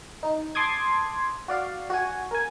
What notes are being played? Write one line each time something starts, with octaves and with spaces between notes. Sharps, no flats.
D#4
A5 C6 D6 D#6 G#6
F#4 D5 F5
F#4 G#5
A#4 G#5